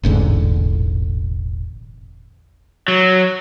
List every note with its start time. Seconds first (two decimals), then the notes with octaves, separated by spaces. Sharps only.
0.03 E1 A1 G#2 D3
2.88 F#3